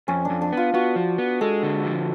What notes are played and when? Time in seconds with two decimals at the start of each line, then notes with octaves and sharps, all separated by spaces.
0.08 F2 C#4
0.25 D4
0.30 F2
0.42 D4
0.53 B3 F4
0.74 B3 F#4
0.96 F3
1.18 B3
1.41 G#3 A4
1.63 D3
1.85 F3